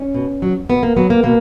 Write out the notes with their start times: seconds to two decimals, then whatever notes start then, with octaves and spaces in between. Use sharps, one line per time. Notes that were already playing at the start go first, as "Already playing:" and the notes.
Already playing: C#4
0.15 B2
0.42 F#3
0.69 B2 B3
0.83 A#3
0.97 F#3 B3
1.10 A#3
1.23 B2 A#3